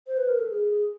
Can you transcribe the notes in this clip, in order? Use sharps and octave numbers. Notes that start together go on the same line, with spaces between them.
C5
B4
A#4
A4
G#4